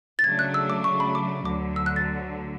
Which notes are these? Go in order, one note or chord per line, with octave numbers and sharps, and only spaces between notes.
A6
C#3 F#3 A3 D4 G#6
F#6
E6
D6
C#6
B5
D6
D2 D3 F#3 D6
E6
F#6
A6